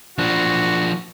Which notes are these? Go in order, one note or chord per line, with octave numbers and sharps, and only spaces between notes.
F3 D4 F#4